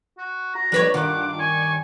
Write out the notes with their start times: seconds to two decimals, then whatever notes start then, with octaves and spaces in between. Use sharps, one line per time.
0.18 F#4
0.55 F#4 A#5
0.72 F3 G3 D4 B4 C#5
0.94 G2 D#3 D4 F4 F#5 D6
1.39 D5 G#5 C#6